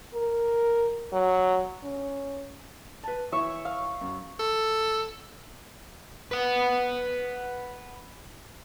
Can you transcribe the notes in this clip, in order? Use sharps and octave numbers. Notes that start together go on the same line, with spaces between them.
A#4
F#3
C#4
B4 A5
E3 E4 E5 C#6
F5
F#2
A4
B4 F#5